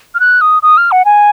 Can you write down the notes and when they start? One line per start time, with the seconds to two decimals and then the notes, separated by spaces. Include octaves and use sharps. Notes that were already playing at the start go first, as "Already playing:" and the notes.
0.15 F6
0.20 F#6
0.41 D#6
0.63 D#6
0.77 F6
0.92 F#5
1.05 G#5